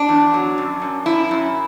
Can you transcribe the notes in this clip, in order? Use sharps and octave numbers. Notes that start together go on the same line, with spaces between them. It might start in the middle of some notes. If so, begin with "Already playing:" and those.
Already playing: D4
E2
F#3
F#2
F#2
F#2 E4
F#2